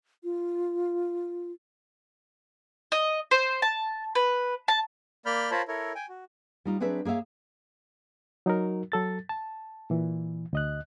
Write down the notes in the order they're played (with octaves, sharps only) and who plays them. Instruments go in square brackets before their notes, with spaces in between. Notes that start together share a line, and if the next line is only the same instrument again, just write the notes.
[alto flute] F4
[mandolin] D#5
C5
A5
B4
A5
[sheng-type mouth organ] A#3 D5 B5 F6 G6
F4 A#4 C5 C#5 A5 B5
E4 A4 A#4 C#5
G5 G#5
F#4
[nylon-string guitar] G3 D#4 F4
F#3 C4 D4 G#4 B4 E5
A#3 G#4 C#5 E5 F5
[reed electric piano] F#3 D#4 F#4 A#4
F#3 A4 A6
A5
A#2 E3
D2 D#5 F#6